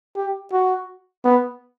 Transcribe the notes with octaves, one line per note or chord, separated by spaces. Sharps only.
G4
F#4
B3